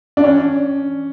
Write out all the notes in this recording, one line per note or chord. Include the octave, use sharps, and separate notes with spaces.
D4
C#4